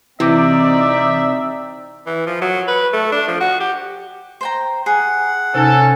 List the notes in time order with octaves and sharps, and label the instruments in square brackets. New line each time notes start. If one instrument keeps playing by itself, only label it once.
[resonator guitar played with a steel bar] C3 [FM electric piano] E3 D6 [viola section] C4 D#4 D5 [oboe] E5
[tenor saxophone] E3
F3
F#3
B4
A3
D4
F3
F#4
G4
[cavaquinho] C5 G5 A#5
[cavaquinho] G#4 [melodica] F#5
[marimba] C3 D#4 G#5 [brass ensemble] C#4 A4